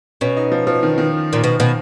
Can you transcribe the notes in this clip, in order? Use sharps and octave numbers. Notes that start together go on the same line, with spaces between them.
B2 C#4
D#4
F3
F3
D#3
D#3
A#2
B2
B2